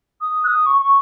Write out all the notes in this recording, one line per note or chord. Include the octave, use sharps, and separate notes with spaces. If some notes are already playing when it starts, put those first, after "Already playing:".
D#6
F#6
D#6
C#6
C#6